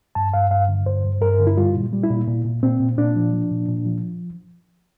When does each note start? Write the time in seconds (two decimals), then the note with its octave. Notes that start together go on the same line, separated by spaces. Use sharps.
0.15 G2 A5
0.34 G2 F5
0.51 G2 F5
0.69 D3
0.86 G2 C5
1.04 G2
1.21 G2 A#4
1.39 D3
1.47 E4
1.57 G3 F4
1.74 A#2
1.93 G3
2.04 E4
2.10 A#2
2.27 A#2
2.45 A#2
2.63 A#2 C4
2.80 A#2
2.98 A#2 D4
3.16 F3
3.33 F3
3.51 A#2
3.68 A#2
3.86 F3